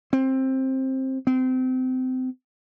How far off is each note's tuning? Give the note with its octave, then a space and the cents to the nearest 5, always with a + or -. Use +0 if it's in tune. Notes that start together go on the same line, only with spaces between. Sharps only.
C4 +15
C4 -30